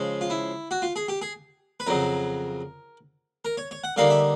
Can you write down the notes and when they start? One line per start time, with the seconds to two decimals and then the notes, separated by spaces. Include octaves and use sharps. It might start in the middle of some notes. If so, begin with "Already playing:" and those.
Already playing: C#3 F3 G#3 C#4
0.21 F4
0.30 E4
0.71 F#4
0.82 F4
0.96 G#4
1.08 G4
1.22 G#4
1.80 B4
1.87 F2 C#3 F#3 A#4
3.45 A#4
3.57 C#5
3.71 C#5
3.84 F#5
3.96 D3 G3 A#3 D#4 F5
4.10 E5